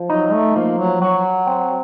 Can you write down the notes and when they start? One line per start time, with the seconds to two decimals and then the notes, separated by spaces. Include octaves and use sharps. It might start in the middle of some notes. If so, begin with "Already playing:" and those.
Already playing: F3
0.09 F#3 D#4
0.32 A3
0.56 F3 A#3
0.79 F#3
1.01 F#3 F#4
1.47 C4